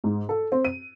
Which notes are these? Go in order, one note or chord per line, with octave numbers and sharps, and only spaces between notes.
G#2
A4
C4
D#7